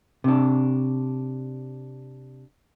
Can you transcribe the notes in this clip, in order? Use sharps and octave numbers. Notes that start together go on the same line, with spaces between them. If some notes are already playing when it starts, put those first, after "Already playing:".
C3 D4